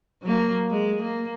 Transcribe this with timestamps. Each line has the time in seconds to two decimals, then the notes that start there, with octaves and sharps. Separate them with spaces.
0.22 F#3 A#3
0.71 G#3
1.03 A#3